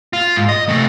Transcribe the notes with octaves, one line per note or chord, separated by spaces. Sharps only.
F4
G#2
D#5
C3 A3